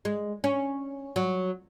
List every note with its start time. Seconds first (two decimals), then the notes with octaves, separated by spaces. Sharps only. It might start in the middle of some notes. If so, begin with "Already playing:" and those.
0.05 G#3
0.44 C#4
1.16 F#3